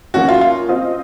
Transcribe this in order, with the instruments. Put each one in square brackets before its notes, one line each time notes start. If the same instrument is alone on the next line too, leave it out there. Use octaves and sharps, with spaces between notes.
[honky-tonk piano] F3 A#3 C#4 [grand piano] F#4
[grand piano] F4
F4
[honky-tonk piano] C4 F4 C5 D#5